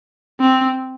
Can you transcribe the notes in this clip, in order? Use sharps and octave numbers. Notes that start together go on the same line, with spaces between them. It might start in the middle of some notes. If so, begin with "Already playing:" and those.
C4